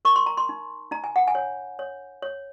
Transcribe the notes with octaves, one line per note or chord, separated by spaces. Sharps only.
A#4 C#6
C6
A#5
C6
D#4
D#4 A#5
G#5
F#5
G#5
C#5
C#5
C#5